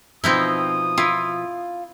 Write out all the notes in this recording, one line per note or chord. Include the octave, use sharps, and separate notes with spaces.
B2 F3 C4 D#4 E4 D#6
E4 F4